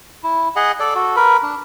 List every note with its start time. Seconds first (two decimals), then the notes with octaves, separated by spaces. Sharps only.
0.23 E4
0.56 G#4 D#5 F#5
0.80 A4 D5
0.95 F#4 A4
1.16 A#4 B4 B5
1.43 D4